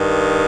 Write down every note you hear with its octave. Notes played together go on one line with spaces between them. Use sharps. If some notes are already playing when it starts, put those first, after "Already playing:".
Already playing: G2 D#3